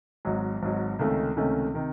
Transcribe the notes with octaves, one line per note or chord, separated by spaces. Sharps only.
G#1 G#2 F#3
G#1 G#2 F#3
C#2 C3 D#3 A3 C#4
C#2 C3 D#3 A3 C#4
C3 D#3